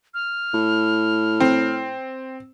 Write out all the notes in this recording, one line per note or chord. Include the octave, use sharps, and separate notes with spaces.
F6
A2
C4